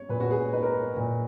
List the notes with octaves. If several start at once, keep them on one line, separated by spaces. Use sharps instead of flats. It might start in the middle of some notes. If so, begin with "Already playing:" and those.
Already playing: C#5
A#2 B4
F#4
G#4
D#4 B4
A#4
B4
A#2